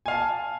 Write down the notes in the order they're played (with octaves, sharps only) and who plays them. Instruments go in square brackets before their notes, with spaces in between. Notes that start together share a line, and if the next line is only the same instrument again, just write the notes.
[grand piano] G#5
F5
A5